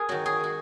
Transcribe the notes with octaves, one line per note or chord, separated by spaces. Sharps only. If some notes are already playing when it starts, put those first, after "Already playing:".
Already playing: G#4 A#4
D#3 F#3 F#4
G#4
F#4